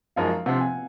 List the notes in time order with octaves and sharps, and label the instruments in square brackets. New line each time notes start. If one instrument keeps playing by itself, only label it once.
[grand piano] F#2 F3 G#3 D#4 A#4 [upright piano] F5
[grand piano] C3 F3 C4 [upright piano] F#5
[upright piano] G#5